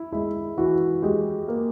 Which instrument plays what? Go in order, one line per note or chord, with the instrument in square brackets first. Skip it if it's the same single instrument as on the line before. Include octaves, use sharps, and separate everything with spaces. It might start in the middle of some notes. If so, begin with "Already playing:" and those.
Already playing: [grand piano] E4
[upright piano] G#3 [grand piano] E4
[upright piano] E3 [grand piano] F#4
[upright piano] G#3 [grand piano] G4
[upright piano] A#3